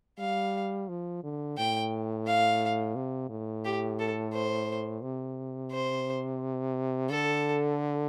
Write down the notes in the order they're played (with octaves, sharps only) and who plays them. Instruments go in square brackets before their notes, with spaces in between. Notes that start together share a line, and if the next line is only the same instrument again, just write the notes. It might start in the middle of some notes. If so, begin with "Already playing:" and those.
[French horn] G3 [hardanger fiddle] F5
[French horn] F3
D3
[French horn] A2 [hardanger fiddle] G5
[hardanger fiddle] F5
[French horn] C3
A2
[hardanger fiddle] G4
A4
C5
[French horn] C3
[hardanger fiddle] C5
[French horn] D3 [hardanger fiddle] A4